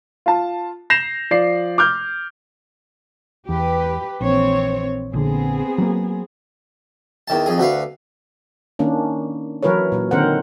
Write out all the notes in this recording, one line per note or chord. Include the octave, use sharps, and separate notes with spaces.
F4 A5
G6 A#6 C7 E7 F7
F3 D5 C7
D6 F6 G6
E2 G4 B4
A#1 E3 C4 C#5
A#1 D3 B3 C4 G#4
F#3 A3 A#3
E2 D#3 A5
F2 G#4
D2 F#4 B4 F5
D#3 A#3 C#4 D4
E3 F#3 E4 A#4 B4 C#5
A#2 F#3
D3 D#3 C4 A#4 C5 F#5